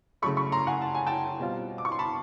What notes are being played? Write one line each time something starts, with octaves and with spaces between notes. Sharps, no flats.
C#3 F#3 A3 B5 C#6
B5 C#6
A#5 C6
F#5 G#5
A5
G#5
G5 A5
B2 G3 C4 F4
D6
C#6
C6
A5 B5